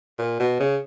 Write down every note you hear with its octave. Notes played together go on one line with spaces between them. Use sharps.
A#2
B2
C#3